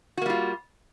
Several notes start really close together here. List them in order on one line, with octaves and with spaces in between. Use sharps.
F#4 A#3 G3 F4